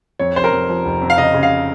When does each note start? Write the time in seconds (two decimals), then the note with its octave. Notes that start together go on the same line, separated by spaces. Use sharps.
0.19 F2 C#5
0.36 F1 C5
0.44 A#4
0.52 F2
0.69 F3
0.85 F1
1.02 F2
1.10 F5
1.18 C#3 D#5
1.34 C#3
1.43 F5